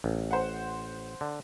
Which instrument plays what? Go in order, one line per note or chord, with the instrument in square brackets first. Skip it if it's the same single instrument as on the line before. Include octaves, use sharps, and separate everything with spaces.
[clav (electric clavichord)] A1
[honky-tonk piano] C5 F#5
[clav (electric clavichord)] D3